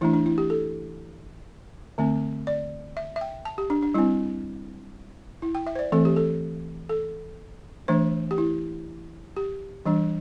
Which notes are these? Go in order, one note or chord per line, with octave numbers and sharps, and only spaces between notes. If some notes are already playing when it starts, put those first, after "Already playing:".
E3 A3 D4 E4
D4
E4
G4
A4
D3 A3 C4
D5
E5
E5
G5
A5
G4
D4
D4
G3 C4 E4
E4
G5
E5
C5
D5
E3 A3 C4 A4
G4
A4
A4
E3 A3 D4 C5
G4
E4
G4
E3 G3 D4